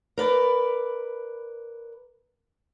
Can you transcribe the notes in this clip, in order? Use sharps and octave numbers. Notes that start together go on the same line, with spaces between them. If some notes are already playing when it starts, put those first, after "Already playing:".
A#4 B4 D5